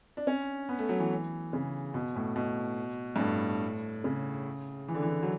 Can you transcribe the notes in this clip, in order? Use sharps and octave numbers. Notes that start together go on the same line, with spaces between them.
D4
C#4
B3
A3
F#3
E3
C#3
B2
A2
B2
G2
A2
C#3
E3
D3
E3
F#3